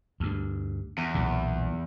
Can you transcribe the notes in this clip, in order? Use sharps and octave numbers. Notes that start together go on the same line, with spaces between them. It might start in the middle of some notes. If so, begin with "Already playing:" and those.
D2 G2
E2
B1 A#2